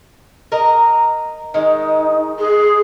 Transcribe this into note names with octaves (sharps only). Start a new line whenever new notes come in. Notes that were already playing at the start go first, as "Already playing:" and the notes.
A#4 D#5 A#5
D#3 G#3 D#4
G#4